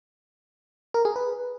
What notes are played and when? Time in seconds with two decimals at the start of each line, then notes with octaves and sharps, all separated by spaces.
0.94 A#4
1.05 G#4
1.16 B4